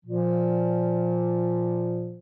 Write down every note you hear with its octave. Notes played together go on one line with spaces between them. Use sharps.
A#2 F3